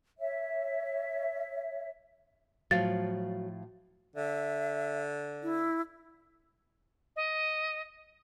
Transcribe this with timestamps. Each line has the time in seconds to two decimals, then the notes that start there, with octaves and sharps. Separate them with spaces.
0.18 C#5 E5
2.71 A2 F3 F#3 F5 A6
4.16 D3 E5
5.43 E4
7.16 D#5